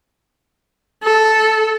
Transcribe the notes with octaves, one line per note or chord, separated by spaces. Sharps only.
A4